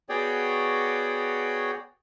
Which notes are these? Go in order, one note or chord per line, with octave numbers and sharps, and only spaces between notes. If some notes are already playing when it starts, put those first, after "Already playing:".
B3 F#4 G#4 C#5 D5 G5